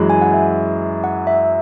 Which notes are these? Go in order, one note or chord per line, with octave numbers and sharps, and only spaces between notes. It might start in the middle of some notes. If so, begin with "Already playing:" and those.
Already playing: F#2 E3 G#3
G#5
F#5
E5
F#5
E5